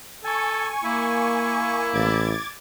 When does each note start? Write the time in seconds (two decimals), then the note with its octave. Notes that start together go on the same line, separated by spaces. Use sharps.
0.24 A4 G#5 C#6
0.84 A#3 E4
1.94 A1 D6 G#6 A6